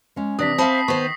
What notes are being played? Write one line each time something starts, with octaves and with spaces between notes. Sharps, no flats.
G#3 C#4
C3 E3 D4 D5 D#6 A#6 B6
C4 C5 E5 F5 A5 B5 D#6 F#7
B6 C7
D#3 B3 C5 C#6